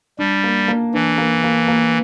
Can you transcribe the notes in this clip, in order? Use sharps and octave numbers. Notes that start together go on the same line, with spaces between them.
G3 D4
A#3
A#3
E3 D4
A#3
A#3
A#3